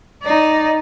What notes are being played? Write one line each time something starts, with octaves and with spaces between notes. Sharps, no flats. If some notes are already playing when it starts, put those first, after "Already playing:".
D#4 D5